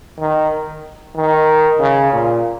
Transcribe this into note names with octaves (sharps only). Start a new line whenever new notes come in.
D#3
D#3
C#3
A#2